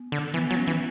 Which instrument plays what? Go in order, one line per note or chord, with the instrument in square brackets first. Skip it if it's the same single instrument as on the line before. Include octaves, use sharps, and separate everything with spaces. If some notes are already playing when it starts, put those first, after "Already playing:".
Already playing: [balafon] B3
[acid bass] D3
[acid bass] E3 [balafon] B3
[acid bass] F#3 [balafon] B3
[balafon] C#4
[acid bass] E3